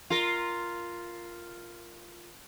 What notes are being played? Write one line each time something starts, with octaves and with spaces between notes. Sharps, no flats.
F4 A#4